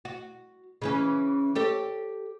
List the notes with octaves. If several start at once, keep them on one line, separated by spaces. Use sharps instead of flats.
F#4
C#3 E3 C#4
G4 A4 C#5